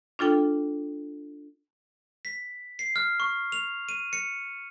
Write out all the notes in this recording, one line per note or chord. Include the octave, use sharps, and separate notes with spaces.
D4 F4 A4 G5
B6
C7
F6
C#6
F7
D#7
C#7